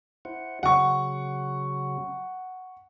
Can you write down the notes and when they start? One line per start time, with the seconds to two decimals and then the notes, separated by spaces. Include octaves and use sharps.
0.25 E4 C5 F#5
0.63 C#3 F#3 F#5 C#6